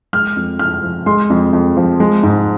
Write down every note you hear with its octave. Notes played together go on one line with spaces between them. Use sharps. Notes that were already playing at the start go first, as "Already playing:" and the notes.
G#3 F6
F2
F2 F6
F3
G#3 C6
F2
F2
F3
G#3
G#2